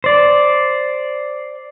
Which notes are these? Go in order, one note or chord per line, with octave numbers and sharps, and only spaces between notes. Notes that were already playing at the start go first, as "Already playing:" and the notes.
C5 D5